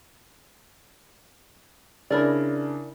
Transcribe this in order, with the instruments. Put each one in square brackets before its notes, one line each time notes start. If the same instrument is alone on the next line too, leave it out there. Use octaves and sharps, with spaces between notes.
[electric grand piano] C#3 D4 [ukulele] E4 A#4 D5